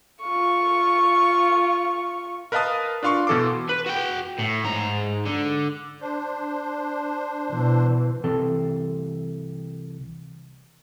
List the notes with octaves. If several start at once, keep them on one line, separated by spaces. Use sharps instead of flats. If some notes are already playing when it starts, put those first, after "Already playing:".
F4 C#6
A#4 B4 D#5 F5 A5 D#6
D4 F4 F5 C6 C#6
B2 E3 A4 C6 D6
B4
F#4 G5
A2
G#2 A#5
D3
D4 C5
B2 E3
C2 E3 C4 A4 A5 C6